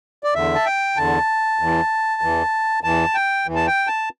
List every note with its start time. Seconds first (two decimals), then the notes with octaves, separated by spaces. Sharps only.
0.24 D5
0.34 E2 D3 E5
0.55 A5
0.66 G5
0.97 E2 D3 A5
1.59 E2 E3
2.21 E2 E3
2.83 E2 E3 A5
3.14 G5
3.46 E2 E3
3.55 A5
3.67 G5
3.87 A5